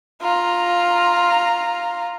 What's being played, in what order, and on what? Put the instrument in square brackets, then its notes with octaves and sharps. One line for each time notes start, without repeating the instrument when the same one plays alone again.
[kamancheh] F4 A#5